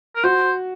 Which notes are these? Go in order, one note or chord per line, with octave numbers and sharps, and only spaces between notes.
A#4
F#4 C5